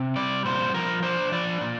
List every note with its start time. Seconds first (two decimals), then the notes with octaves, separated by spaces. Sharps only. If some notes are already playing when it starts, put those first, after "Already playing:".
Already playing: C3
0.16 G3 D5
0.45 A#2 C5
0.74 F3 A#4
1.03 D4 C5
1.32 F3 D5
1.61 A#2